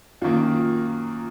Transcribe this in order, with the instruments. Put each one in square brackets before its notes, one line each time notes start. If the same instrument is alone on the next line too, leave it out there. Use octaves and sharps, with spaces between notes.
[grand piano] F#2 D#3 A#3 [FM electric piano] F4